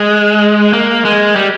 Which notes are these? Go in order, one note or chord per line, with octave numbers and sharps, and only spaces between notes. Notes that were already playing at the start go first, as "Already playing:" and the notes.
Already playing: G#3
A#3
G#3
G3